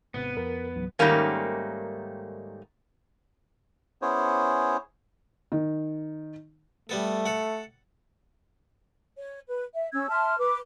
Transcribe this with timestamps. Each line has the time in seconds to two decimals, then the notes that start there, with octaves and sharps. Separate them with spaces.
0.14 G#1 C3 B3
0.37 F2 A#4
0.76 C#2 G#2 E3 F#3
0.99 G#2 D#3 G3 A3 A#3 C#4
4.02 B3 C#4 E4 G#4 C5 C#5
5.52 D#3
6.89 G3 A3 B3 A4
7.25 A4 F#5
9.17 C#5
9.48 B4
9.74 E5
9.93 C#4 E6 G#6
10.10 E5 A5 C6 F6
10.39 B4 D6